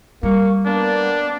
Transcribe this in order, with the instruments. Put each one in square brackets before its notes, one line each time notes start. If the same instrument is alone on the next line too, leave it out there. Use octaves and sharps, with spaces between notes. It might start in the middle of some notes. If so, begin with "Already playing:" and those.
[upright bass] G3 [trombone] A#3 [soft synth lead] C#6
[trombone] A#3 [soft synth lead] B3 [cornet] D4